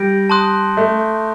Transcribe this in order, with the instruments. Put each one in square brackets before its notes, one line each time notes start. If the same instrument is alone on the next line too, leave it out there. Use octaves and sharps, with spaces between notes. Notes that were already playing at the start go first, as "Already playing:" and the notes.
Already playing: [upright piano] G3 [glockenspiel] G6 A#6 D7
[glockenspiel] A5 C6 D#6 F#6
[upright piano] A3